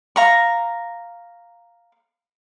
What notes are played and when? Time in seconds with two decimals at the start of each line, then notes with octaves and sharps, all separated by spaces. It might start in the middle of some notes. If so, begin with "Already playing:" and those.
0.16 F5 A#5 C#6